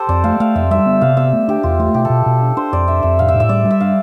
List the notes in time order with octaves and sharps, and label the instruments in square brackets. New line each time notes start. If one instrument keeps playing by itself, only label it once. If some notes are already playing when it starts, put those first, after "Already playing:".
Already playing: [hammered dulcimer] G4 A4 C5
[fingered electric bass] F2 [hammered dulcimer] D5
[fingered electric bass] A3 [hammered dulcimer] F5
[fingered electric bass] A3 [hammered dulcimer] F5
[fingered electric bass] F2 [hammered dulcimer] E5
[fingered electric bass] G3 [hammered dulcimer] E5
[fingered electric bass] B3
[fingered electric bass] C3 [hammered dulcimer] F5
[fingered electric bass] B3 [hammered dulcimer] E5
[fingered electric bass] A3
[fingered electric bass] D4 [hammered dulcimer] G4
[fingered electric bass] E2 [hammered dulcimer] F4
[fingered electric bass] A3 [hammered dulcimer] F4
[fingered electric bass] B2 [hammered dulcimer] G4
[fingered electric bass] B2 [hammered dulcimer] A4
[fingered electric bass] B2
D4
[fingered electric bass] D4 [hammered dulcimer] C5
[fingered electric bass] F2 [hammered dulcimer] D5
[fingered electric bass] D4 [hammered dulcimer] E5
[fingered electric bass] F2 [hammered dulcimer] E5
[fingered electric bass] A2 [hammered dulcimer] F5
[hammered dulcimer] E5
[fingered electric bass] A2
[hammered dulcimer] E5
[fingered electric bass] G3 [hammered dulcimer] D5
[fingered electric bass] G3
[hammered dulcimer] E5
[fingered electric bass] D4 [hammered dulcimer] F5